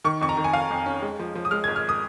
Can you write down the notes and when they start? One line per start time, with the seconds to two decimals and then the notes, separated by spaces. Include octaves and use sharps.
0.04 D#3 C#6
0.21 F2 C#6
0.29 A#5
0.37 D#3
0.44 G#5
0.53 F2 F5
0.71 F2
0.86 C#4
1.02 G#3
1.19 F3
1.35 F3
1.45 D#6
1.51 G#3 F6
1.64 G#6
1.67 G#1
1.76 F6
1.89 D#6